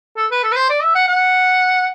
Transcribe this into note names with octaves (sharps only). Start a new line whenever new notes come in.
A4
B4
A4
B4
C5
D5
E5
F#5
F#5